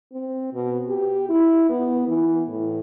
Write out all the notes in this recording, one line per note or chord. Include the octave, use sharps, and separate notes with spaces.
C4
B2
G4
E4
B3
E3
A2